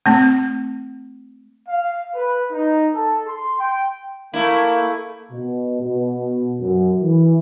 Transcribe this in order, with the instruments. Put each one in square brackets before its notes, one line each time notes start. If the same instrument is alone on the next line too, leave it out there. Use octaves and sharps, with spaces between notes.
[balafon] A3 C4
[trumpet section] F5
B4
D#4
A4
C6
G5
[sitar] A3 E4 [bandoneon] A#3
[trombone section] B2
B2
F#2
E3